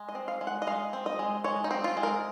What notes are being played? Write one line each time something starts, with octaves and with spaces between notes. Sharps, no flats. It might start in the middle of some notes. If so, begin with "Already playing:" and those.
Already playing: G#3
D#5
C4
F5
G#3
F#5
D#5
G#3 F5
C4
D#5
G#3
G#3 C#5
D#4
C4
F4
G#3
A#4